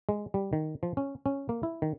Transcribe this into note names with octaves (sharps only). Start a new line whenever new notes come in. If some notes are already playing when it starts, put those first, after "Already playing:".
G#3
G3
D#3
F3
C#4
C#4
A#3
E4
D#3